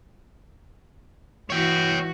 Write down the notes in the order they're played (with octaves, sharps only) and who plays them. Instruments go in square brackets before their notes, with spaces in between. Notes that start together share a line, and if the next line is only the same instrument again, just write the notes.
[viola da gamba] E3 F#4 [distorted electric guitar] C#5 G5